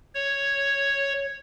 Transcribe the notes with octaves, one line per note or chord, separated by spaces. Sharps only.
C#5